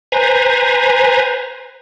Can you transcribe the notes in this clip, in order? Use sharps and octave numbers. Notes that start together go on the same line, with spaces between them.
B4 C5 G#5 A#5